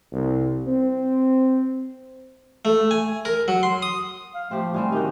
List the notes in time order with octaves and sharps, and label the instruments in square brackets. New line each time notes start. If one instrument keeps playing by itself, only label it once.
[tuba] C2
C4
[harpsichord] A3
G#5
A#4
F#3
C6
D#6
[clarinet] F5
[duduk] F3 [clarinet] A3 [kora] C4 G4
[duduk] G3 [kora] C4 C#4 E4
[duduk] D#3 [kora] D#4 F#4 [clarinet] G4